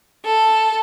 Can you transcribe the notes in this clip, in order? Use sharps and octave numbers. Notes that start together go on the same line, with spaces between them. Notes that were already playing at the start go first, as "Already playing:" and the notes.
A4